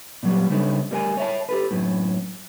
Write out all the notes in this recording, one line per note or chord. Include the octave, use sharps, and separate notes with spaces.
A#2 F#3 G3
C#3 G3 D4 D#4 A4 C#5
G3 A3 A#4 E5 G#5
C#5 E5 A5
G4 A4 B4
F#2 A2